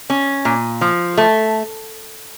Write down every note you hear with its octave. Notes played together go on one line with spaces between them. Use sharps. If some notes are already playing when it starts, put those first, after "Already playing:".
C#4
A#2
F3
A3